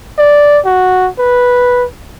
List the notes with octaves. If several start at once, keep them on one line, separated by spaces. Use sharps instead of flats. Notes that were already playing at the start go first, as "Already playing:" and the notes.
D5
F#4
B4